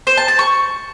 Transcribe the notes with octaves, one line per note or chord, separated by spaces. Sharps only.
C5
A5
A5
C#6